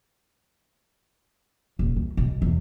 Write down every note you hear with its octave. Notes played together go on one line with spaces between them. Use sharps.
D#1
E2
B1
E2